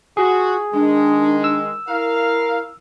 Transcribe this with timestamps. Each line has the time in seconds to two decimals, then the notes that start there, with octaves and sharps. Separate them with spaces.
0.17 F4 F#4 G#4
0.74 D#3 G#3 D4
1.44 E6
1.88 E4 A#4 F5